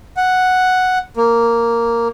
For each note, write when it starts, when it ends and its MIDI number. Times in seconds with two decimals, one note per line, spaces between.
0.17 0.98 78
1.17 2.08 58